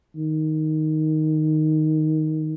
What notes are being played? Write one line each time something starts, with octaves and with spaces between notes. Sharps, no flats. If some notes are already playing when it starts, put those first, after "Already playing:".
D#3